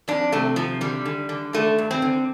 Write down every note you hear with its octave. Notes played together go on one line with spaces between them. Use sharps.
F2 D4
C3 A3
C3 F3
D3 G3
D3
D3
D3 A3
G2
C4
D3